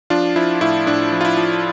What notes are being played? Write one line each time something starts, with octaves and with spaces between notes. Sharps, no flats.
F3 D4 F4
F3 E4
A2 E4
A2 D4
F3
F4
E4
F3